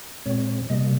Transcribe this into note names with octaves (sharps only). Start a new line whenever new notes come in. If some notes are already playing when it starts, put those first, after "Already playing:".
A#2 G#3 C4 C#5
C#5
C3 G3 A#3 D#5